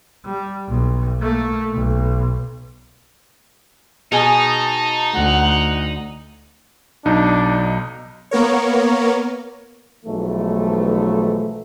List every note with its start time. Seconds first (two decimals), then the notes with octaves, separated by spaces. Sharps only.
0.25 G3
0.67 B1
1.20 A3 A#3
1.72 B1
4.12 B2 D#4 G#4 G#5 A5
5.13 D2 F#5
7.05 B1 D4 D#4
8.31 A#3 B3 A#4 C#5
10.05 B1 G#2 E3 F3 A3